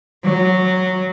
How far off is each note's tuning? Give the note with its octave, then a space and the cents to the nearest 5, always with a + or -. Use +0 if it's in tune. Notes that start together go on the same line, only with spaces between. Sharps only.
F#3 -5